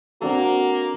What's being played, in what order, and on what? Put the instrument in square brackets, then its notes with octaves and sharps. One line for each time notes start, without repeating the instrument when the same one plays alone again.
[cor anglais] A#3 [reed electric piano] C4 D4 A4 [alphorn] F#4